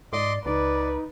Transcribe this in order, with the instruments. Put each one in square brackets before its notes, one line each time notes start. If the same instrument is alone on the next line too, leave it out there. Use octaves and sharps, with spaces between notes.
[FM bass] G#2 [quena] D5 [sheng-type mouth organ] D#5 C6 D6
[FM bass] C#2 [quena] D#4 [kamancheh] B4 [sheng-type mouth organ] D5